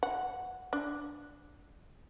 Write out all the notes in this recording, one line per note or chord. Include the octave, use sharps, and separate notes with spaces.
F#5
D4